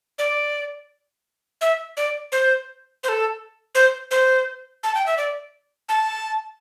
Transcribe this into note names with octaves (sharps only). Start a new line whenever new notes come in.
D5
E5
D5
C5
C5
A4
C5
C5
A5
G5
E5
D5
A5